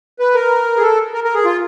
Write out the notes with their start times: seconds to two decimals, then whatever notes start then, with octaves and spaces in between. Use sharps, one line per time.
0.19 B4
0.35 A#4
0.78 G#4
0.82 A4
1.14 A#4
1.24 A#4
1.35 G#4
1.45 F4